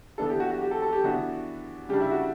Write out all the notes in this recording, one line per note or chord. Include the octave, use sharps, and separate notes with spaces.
E3 B3 D4 A4
G4
F#4
F#4
G4
A4
A4
G4
E3 B3 D4 F#4
C#3 G3 D4 G4
E4
F#4